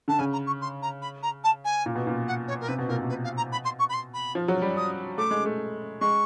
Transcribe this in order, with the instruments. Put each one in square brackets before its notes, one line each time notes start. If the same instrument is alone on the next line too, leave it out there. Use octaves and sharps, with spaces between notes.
[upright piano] D3 [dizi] A5
[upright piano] C#3 [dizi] G#5
[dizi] A#5
C#6
C6
A#5
B5
A#5
A5
G#5
[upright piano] A#2
B2
A#2
[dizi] F#5
C#5
A#4
[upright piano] C3 [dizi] B4
[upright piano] B2
[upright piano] A#2 [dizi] A#4
[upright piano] B2
[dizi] B4
F5
A#5
B5
C6
C#6
B5
C6
B5
[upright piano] F3
F#3
G3
[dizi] D#6
[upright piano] A3 [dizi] D6
[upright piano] G#3
A3
[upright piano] G#3 [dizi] C#6